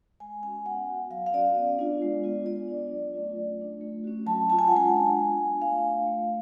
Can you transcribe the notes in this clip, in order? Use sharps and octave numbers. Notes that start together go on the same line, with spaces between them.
G#3 G#5
C#4 F#4 G#5
B3 F#5
F#4
F#3 F5
F5
C#4 F#4 D5
B3
D4 F4
G#3
B3 F4
B3 D5
D4 F4
F#3
A3 C#4 F4
F#3
A3 D4 F4
A3
C#4 F#4
F#3 A5
C#4 F4 A5
G#5
F#5
G#3 G#5
D4 F4
B3
D4 F4
A3 F5
D4 F4
A3